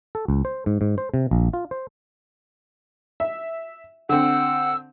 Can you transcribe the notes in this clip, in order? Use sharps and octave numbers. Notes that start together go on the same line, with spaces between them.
A4
C#2
C5
G#2
G#2
C5
C3
A#1
F4
C5
E5
D3 C4 F#5 E6